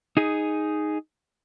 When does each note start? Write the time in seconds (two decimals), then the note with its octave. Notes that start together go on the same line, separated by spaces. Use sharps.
0.17 D#4 G#4